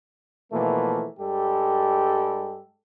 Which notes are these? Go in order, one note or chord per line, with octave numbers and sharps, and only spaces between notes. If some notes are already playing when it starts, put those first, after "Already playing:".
B2 E3 F3 A3 A#3
G2 G3 G#3 G4 A4